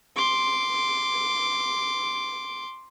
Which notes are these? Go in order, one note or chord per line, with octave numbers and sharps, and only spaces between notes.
C6 D6